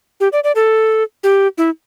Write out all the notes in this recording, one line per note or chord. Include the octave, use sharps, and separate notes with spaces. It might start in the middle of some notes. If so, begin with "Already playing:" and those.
G4
D5
D5
A4
G4
E4